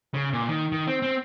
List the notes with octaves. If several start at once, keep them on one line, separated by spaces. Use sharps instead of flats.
C#3
A#2
D#3
D#3
C4
C4